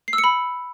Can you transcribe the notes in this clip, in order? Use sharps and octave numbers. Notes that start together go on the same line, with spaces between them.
C7
E6
C#7
B5